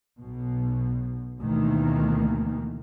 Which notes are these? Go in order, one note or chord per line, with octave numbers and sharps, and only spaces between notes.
B1 B2
D2 B2 D#3 E3 A#3